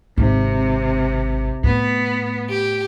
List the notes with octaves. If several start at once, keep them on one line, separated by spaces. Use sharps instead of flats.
G#1 C3
A2 B3
G4